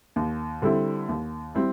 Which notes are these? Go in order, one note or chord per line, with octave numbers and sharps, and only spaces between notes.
D#2
D3 G3 C4 E4
D#2
G3 C4 E4